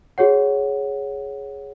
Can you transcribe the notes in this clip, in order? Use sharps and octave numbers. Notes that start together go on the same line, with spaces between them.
F#4 G#4 C#5 F#5